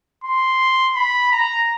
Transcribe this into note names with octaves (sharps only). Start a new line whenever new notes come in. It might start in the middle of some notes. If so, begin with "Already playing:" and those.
C6
B5
A#5